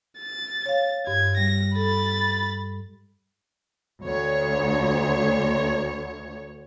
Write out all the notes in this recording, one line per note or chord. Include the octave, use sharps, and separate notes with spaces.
A6
C#5 F5
G2 G#6
G3 A#6
A4 B5 A6
D2 C#5